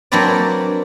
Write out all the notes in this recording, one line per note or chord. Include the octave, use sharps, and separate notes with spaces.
F#3 A#3 C4 D4 B4 D5